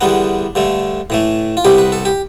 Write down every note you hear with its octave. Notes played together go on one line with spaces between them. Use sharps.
E2 D3 G3 B3 D4
G2 D3 A3
A2 E3 A3
F4
C2 C3 G3 B3 G4
B4
A4
G4